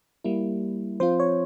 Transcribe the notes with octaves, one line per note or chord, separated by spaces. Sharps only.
G3 A#3 E4
F3 C4 F4 C5
C#5